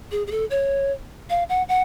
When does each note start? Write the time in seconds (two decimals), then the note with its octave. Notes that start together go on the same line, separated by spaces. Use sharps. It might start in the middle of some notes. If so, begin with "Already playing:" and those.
0.11 G#4
0.27 G#4
0.31 A4
0.50 C#5
1.30 F5
1.49 F#5
1.69 F#5